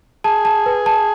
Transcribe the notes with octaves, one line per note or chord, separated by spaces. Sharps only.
G#4 A5
A5
B4
A5